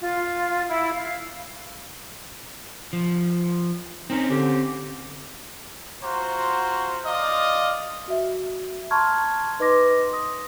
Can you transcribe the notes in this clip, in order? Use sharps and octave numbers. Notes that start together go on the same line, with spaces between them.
F4
E4
F5
F3
C4 C#4 D#4 A#4
D3 G4
F4 F#4 C5 A#5
F4 D5 D#5 F5
F#4 E5
A5 A#5 C6 C#6 F6 G#6
D#4 B4 D#5 C6 D6 A#6
D#6 A#6